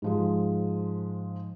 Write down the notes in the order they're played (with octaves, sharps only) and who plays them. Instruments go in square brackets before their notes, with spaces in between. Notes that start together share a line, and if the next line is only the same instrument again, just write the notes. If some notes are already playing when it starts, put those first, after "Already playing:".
[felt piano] G#2 F3 G#3